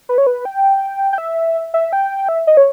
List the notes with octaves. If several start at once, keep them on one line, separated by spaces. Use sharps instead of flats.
B4
C#5
B4
G5
G5
E5
E5
G5
E5
D#5
C#5